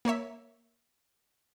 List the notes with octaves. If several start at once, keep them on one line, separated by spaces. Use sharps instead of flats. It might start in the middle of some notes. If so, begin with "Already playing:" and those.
A#3 A#4 C#5 E5